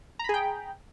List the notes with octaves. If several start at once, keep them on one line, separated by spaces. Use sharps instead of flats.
G#4 G5 A#5 B5